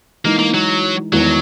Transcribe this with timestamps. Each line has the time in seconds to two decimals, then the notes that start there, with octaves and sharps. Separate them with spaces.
0.24 E3 G#3 A#3 D#4
0.39 A#3
0.54 F#3
1.13 E2 D#3 F#3 G#3 B3 E4